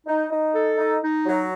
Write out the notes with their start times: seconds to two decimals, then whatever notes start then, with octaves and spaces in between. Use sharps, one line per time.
0.07 D#4
0.30 D#4
0.55 A4
0.78 D#4
1.02 D#4
1.26 F#3